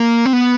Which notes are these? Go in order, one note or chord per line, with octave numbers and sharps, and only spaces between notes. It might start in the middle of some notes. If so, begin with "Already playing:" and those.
Already playing: A#3
C4
B3